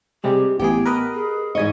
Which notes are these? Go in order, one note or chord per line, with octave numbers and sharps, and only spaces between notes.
C3 G3 G#3 G4
A1 E3 B3 G4 G#4
A#4 B4 D#5
G#4
G#2 E3 D#5 G#5 C#6